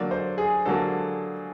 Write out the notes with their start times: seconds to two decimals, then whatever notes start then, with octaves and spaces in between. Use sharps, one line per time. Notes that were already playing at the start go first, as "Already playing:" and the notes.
Already playing: D3 F#3 A#3 D5
0.11 C5
0.38 G#4
0.66 D3 F#3 A#3 A4